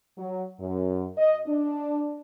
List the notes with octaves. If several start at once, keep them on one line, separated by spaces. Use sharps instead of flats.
F#3
F#2
D#5
D4